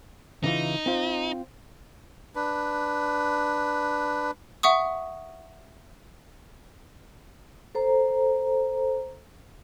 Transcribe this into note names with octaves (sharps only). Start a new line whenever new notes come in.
C#3 E3 D#4 F4
C4 F4
D4 B4
E5 F#5 C#6 D#6
A4 C5 A#5